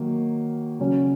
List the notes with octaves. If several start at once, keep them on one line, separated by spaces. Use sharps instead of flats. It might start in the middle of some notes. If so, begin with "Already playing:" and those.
Already playing: D#3 F#3 A#3
C#3 F#3 C#4